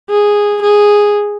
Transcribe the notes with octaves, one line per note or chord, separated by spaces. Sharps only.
G#4
G#4